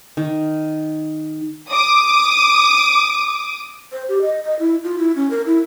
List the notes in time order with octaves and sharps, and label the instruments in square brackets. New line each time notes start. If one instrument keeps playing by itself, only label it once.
[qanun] D#3
[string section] D6 D#6
[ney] C5
G4
D#5
D#5
E4
F4
E4
C#4
A#4
E4